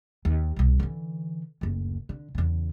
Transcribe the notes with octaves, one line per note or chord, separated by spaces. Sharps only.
D#2
C2 B2
D3 E3
F#1 D2
D3
E2 C#3